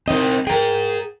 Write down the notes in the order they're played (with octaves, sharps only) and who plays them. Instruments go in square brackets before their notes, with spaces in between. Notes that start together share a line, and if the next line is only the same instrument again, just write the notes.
[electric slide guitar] C4 E4 A#4 [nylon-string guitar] D#4 D#5
[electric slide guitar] G#4 A#5 [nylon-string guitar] A#4 G5